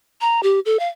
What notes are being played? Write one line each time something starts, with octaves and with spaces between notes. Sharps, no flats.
A#5
G4
A4
F5